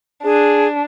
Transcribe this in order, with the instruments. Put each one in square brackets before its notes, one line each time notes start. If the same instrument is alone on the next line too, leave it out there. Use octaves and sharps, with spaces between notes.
[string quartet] D4 [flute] G#4